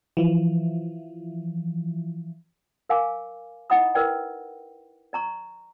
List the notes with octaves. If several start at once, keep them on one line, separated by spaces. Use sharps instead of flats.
E3 F3
A#4 F5 G#5 D6
D#4 E4 D#5 F#5 B5 D#6
E4 A#4 B4 D5 G5
D5 A#5 C#6